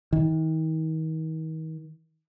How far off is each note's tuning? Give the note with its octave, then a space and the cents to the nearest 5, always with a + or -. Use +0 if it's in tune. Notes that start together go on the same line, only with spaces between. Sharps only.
D#3 +40